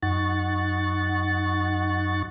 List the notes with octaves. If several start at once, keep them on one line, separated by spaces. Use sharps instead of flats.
F#2 D#4 F#5 C#6 A6